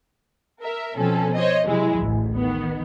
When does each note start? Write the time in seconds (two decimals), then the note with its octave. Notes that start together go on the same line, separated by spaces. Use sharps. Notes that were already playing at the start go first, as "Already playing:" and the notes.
0.62 A#4 E5
0.97 B2 F3 C4 C#4 A4
1.36 C5 C#5 D#5
1.66 C3 F#3 G#3 E4
1.97 A1 D2
2.35 D#3 B3